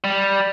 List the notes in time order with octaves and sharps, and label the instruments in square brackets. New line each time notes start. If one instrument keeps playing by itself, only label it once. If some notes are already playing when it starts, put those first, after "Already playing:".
[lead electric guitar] G3